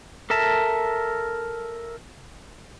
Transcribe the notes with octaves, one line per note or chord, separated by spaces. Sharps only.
A4 A#4 E5 A5